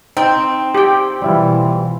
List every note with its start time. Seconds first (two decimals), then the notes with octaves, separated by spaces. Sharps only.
0.17 C4 D#4 G5
0.75 G4 G5
1.22 B2 E3 G3 E4 F4